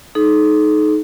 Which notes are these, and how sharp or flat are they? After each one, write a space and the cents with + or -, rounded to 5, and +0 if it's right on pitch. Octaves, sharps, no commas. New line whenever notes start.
D#4 +0 A4 -45